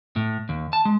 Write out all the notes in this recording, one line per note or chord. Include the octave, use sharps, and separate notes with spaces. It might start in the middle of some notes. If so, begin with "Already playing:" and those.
A2
D#2
A5
G#3